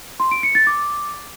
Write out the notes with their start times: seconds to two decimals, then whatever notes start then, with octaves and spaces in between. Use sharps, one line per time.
0.20 C6
0.31 D7
0.43 C#7
0.55 A6
0.67 D6